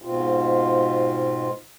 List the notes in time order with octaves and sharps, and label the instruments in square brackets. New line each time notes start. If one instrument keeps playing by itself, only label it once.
[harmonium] G#2 B2 C4 F4